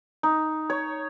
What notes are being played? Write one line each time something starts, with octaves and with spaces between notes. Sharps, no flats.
D#4
C#5